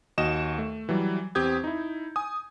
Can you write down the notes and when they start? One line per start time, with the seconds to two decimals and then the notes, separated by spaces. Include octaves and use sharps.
0.18 D#2 F#4 D#5 E7
0.58 A3
0.89 E3 F#3 G3
1.35 E2 C4 G4 D#6 G6 G#6
1.64 D#4 E4
2.16 G#5 D#6